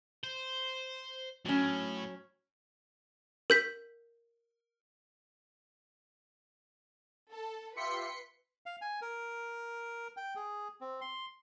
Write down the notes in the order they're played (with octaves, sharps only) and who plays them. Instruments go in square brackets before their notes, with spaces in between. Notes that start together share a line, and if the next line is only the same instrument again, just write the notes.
[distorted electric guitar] C5
[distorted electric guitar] A2 [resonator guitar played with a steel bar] F#3 C#4
[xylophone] A#4 G6 B6
[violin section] A4
[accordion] F4 G4 E5 [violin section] B4 [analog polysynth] C6 B6 C#7
[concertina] F5
G#5
A#4
G5
G#4
C4
C6